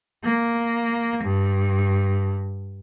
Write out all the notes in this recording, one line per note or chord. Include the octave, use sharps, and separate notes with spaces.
A#3
G2